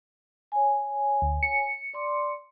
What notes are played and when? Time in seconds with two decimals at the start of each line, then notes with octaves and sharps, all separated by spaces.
0.52 C#5 G#5
1.22 D2
1.43 C#7
1.94 D5 C6 D6